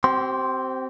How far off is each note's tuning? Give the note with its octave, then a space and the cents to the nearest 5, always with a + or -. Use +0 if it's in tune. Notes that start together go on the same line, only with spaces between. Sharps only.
C4 +0 G4 -40 C6 +0